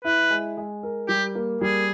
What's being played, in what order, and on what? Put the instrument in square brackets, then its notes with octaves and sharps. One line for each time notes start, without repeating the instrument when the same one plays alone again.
[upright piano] E4 [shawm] B4
[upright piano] G#3
G#3
A#4
[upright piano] G3 [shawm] G4
[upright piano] A#3
[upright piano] G3 [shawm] G#4